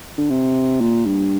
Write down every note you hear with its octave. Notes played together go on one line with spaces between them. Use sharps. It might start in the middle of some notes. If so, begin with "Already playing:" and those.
D3
C3
A#2
G2